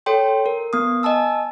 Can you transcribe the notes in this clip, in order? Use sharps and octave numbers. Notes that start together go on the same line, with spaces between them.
A4 C#5 G5 C6
A#4
B3 D#6
D#5 G#5 A5 E6